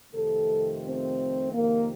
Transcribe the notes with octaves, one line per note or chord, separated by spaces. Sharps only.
F2 C3 D#3 A3 A4
C4
F2 C3 D#3 A#3